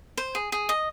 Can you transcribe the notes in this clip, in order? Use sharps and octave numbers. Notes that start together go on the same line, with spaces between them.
C5
G#4
G#4
D#5